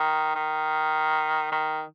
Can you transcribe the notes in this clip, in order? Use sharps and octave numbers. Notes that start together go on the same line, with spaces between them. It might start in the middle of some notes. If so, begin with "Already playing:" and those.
Already playing: D#3
D#3
D#3